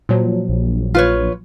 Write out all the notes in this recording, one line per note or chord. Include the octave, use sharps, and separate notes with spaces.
A#2 F3 F#3
A#1
F4 B4 C#5